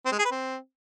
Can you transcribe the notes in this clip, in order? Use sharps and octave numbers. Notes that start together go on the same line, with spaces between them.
C4
G#3
G#4
B4
C4